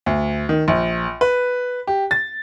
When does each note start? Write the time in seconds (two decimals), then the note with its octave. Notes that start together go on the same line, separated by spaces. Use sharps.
0.06 D2
0.49 D#3
0.68 A#1
1.21 B4
1.87 G4
2.11 A6